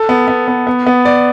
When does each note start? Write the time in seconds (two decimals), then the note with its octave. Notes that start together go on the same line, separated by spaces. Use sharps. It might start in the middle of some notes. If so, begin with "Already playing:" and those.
Already playing: A4
0.09 B3
0.28 B3
0.48 B3
0.67 B3
0.86 B3
1.05 D5